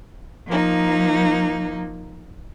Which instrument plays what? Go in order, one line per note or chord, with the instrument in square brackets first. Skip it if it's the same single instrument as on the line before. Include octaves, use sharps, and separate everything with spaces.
[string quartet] F3 A#3 D#4